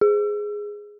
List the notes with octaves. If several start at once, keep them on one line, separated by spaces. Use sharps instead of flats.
G#4